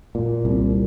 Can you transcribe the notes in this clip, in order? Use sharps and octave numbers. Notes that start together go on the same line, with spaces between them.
A#2
C2